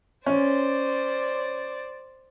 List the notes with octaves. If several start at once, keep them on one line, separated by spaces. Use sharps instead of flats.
C#4 C5 D5